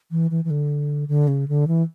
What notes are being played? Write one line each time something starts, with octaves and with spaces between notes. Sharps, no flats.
E3
E3
E3
D3
D3
C#3
D3
E3